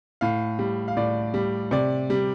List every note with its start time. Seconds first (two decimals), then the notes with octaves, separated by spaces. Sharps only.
0.21 A2 F5
0.59 G3
0.88 F5
0.97 A2 D5
1.34 G3
1.71 C3 D5
2.10 G3